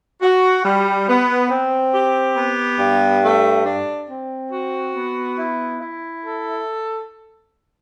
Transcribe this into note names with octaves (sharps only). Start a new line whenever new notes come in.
F#4
G3
B3
C4
G4
B3
G2
A3
D4
C4
F#4
B3
E4
E4
A4